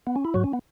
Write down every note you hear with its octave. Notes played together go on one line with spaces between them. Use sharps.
B3
C#4
E4
G#2 F#3 F#4
C#4
B3